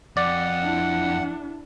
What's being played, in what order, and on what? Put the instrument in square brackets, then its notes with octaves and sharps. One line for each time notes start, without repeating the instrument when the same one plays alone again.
[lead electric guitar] F2 [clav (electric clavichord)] D5 [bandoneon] F#5
[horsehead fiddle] D4 E4